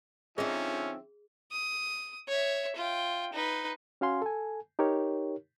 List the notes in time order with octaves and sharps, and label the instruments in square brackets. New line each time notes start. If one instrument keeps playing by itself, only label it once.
[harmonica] D3 F3 E5 [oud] C4 D#4 [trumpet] C#4 [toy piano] G#4
[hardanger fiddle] D#6
C#5 E5
F4 G5
D#4 B4
[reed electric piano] C#4 F#4 F5 G#5 C6
A4 G#5
D#4 G4 A#4 C#5